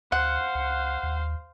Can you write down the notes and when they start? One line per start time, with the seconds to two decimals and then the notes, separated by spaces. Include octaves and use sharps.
0.12 D2 C5 F5 F#5
0.55 C#2
1.03 D#2